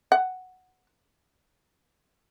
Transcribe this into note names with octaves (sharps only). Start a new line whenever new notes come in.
F#5